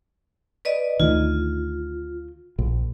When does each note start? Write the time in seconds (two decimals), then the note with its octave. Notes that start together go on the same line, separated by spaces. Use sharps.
0.65 B4 D5 D#5
1.00 D2 D#3 F4
2.59 A#1